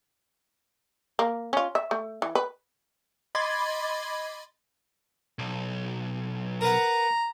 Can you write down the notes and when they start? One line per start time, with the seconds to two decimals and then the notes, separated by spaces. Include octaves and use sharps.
1.19 A#3
1.53 C#4 F4
1.75 E5
1.91 A3
2.22 E3
2.35 B4
3.35 D#5 B5 C6 D6 G#6 A6
5.39 B1
6.61 A#4 B4 F#5 A#5